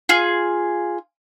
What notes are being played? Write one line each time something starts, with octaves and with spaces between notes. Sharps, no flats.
F4 G#4